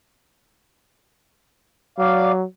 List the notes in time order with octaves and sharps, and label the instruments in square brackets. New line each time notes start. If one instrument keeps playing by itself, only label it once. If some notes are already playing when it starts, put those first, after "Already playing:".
[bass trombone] F#3 [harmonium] D5 F5